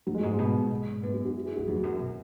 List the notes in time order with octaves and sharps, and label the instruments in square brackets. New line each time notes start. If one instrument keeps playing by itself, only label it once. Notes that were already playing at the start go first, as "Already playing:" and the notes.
[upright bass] F#2 [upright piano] F#3
[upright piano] G#3
[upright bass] G#2 [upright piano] F#3
[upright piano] G#3
[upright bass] B2
G#2
[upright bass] F#2 [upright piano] B3
[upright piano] F#4
F#4
E4
G#4
[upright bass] F#2 [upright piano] F#4
[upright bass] E2 [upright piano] F#3
[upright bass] F#2
B2